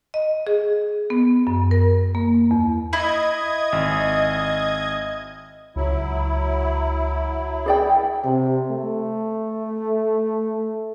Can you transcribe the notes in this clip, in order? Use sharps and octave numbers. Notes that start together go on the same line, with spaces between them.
D#5
G#4
B3
F#2
A#4
A#3
E2
E4 D#5 G#6
G#1
C#2 F#3 E4
G#4 D5 G5
C3
A3